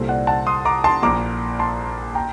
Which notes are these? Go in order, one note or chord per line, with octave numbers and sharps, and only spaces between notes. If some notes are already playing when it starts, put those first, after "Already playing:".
Already playing: C2 A#2 A4 C5
D5 F#5
F#5 A5
C6 D#6
A#5 D6
A5 C6
A#1 A#2 A#5 D6
A5 C6
G5 A#5